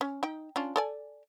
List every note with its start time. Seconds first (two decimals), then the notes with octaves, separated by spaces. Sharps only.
0.01 C#4
0.23 D#4 G5
0.56 C#4 D4 F4
0.76 A4 D5 G#5